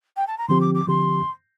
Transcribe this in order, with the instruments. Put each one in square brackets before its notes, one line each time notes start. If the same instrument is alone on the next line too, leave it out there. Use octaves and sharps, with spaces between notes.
[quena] G5
A5
A#5
[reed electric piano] D3 F3 C4 G4 [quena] C6
[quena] D6
D6
[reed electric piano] D3 F3 C4 G4 [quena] C6